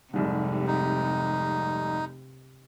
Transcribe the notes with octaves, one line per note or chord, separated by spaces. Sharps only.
F1 C2 G#2 C3
D#4